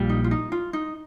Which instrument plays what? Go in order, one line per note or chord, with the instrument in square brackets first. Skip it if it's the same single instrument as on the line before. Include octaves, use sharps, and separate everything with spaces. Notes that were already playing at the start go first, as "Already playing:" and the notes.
Already playing: [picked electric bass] A#1 A#2 G3
[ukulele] D#4
F4
D#4
F4
D#4